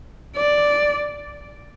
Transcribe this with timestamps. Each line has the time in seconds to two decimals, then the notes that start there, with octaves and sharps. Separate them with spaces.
0.36 D5